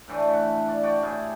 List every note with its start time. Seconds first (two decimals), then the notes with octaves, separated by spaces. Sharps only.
0.08 A2 D3 E3 A3
0.33 F#5
0.68 D5
0.83 F#4 D5 G5
1.02 A2 E4 G4 G#4